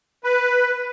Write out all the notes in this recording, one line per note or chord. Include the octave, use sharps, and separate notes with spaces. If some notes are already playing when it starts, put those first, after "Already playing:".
B4